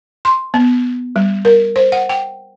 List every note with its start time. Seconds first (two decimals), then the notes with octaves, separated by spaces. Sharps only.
0.25 C6
0.54 B3
1.16 G3
1.45 A#4
1.76 C5
1.92 F#5
2.09 G5